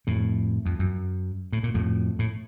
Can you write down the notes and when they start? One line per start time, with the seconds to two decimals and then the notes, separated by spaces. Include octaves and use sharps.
0.07 F2 A2
0.66 F2
0.79 F#2
1.53 A2
1.63 A#2
1.74 F2 A2
2.19 A2